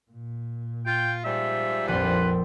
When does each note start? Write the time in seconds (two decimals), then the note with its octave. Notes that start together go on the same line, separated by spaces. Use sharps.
0.11 A#2
0.86 F4 G5
1.25 G#2 F3 G3 E5
1.88 A#1 F2 C4 B4 C6